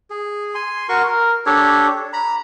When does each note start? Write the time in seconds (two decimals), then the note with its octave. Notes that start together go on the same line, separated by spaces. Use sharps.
0.10 G#4
0.55 G#5 C6
0.89 F#4 A#4 C6 C#6
1.07 A#4
1.46 D4 G4 A4 C#5
2.13 A#5 B5